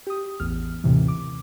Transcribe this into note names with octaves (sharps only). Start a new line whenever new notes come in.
G4 D#6
A1 E2 F6
D#2 A2 C3 E3
D6